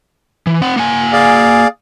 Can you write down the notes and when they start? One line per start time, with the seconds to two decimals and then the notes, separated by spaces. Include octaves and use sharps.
0.47 E3
0.61 C4 F#5
0.76 A#3 F#5 G#5
1.13 G#4 D5 F5